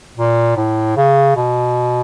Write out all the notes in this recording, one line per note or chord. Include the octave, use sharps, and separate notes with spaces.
A#2
A2
C#3
B2